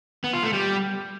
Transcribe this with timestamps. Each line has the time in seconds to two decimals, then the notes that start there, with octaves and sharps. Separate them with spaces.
0.24 B3
0.34 F4
0.43 A3
0.53 G3